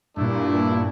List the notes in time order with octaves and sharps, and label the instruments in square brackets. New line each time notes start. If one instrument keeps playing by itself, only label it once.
[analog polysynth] G2 A#2 [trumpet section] A3 D4 E4